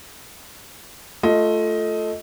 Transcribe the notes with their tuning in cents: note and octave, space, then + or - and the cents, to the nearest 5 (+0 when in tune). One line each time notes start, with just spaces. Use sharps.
A3 +0 F4 +0 D#5 +15